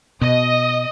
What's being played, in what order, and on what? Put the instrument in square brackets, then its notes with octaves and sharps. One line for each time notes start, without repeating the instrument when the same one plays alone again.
[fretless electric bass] B2 [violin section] D#5 D#6